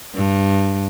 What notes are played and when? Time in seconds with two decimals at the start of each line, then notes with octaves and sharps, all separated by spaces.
0.14 G2